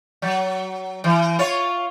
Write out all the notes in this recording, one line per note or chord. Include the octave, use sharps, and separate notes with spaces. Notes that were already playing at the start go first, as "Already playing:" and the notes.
F#3
E3
F4 C#5